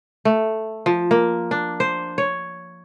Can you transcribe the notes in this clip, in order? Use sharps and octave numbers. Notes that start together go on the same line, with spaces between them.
A3
F3
A#3
D4
C5
C#5